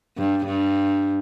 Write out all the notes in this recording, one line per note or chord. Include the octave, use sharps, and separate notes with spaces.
G2
G2